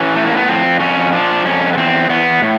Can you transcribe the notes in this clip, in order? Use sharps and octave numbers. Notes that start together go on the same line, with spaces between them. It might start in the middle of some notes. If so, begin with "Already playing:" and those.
Already playing: E3 C#4
A2 A3
A#3
B3
F2 C4
F2 C#4
F3 D4
F2 C#4
B3
E2 C4
E2 B3
A2